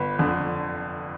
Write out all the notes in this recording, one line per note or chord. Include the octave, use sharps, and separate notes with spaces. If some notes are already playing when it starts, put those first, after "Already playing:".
Already playing: G1 B4
F2 D3